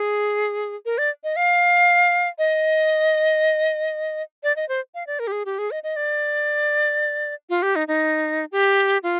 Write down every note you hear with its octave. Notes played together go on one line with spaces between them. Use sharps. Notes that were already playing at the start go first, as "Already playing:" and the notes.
Already playing: G#4
A#4
D5
D#5
F5
D#5
D5
D#5
C5
F5
D5
A#4
G4
G#4
G4
G#4
D#5
D#5
D5
F4
G4
D#4
D#4
G4
F4